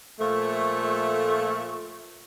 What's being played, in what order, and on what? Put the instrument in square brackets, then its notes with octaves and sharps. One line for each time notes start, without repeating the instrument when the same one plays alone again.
[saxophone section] A#2 F3 A3